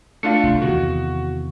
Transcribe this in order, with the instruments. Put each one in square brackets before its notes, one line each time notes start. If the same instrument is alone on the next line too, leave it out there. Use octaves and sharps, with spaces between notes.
[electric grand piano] A3 D4 F4 [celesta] F5 C#7
[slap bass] C2
[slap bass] E2 C3 D#3 [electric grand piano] F#4